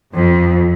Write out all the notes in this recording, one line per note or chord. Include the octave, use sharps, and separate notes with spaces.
F2